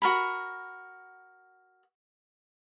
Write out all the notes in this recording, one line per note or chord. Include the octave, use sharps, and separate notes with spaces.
F#4 A#4 B5